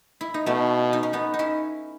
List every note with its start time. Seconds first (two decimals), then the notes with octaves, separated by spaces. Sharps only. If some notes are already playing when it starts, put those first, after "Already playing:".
0.21 E4
0.34 D#4
0.46 B2 A3 C#4
0.93 D#4
1.03 C#4
1.13 B3 D#4
1.34 D#4
1.39 C#4 E4